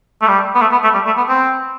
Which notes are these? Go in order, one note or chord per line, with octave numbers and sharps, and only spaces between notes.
A3
G3
B3
A3
B3
A3
G3
A3
B3
C4